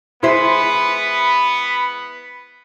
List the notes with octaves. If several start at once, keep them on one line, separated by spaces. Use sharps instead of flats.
G#3 B3 E4 C5 B5